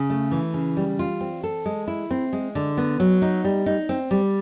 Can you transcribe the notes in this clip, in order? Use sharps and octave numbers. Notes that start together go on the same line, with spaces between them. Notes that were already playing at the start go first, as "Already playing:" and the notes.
Already playing: C#3
A3
E3
C#3
G3
F4
C4
A4
G#3
E4
C4
G#3
D3
B3
F#3
D#4
G3
D#4
C4
G3